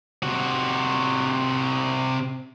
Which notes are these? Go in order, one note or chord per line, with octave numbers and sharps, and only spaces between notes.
C3 F#4